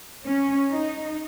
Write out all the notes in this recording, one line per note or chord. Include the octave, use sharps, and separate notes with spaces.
C#4
D#4